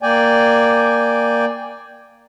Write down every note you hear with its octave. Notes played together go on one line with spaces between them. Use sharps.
A#3 D5 G5 G#5